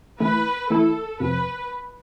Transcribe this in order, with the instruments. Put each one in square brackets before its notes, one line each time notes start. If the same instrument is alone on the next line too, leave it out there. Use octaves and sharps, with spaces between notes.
[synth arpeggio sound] E3 A3 E4 [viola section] B4
[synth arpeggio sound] E3 A3 E4 [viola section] A4
[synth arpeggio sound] F2 C3 F3 [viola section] B4